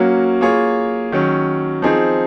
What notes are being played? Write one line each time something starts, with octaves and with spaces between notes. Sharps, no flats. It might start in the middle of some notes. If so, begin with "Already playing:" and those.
Already playing: F#3 A#3 C#4 F#4
A#3 F4 G#4 C#5
D#3 F#3 C#4
F3 C4 D#4 G#4